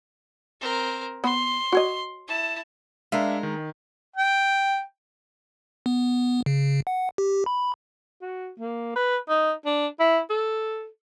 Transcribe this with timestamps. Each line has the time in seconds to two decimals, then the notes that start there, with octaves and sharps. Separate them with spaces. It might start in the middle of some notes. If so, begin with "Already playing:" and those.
0.61 C4 A#4
1.24 B3 C6
1.72 F#4 C#5 D#5
2.27 E4 A5
3.12 G#3 D4 A#4 E5 F5
3.43 D#3
4.16 G5
5.86 B3
6.46 C#3
6.87 F#5
7.18 G4
7.46 B5
8.22 F#4
8.60 A#3
8.96 B4
9.29 D#4
9.66 D4
10.00 E4
10.30 A4